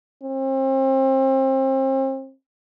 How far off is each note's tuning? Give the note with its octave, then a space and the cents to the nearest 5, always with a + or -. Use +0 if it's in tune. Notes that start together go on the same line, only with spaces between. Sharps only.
C4 +35